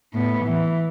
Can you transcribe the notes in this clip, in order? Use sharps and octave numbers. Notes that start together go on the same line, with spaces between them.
A2 B3
E3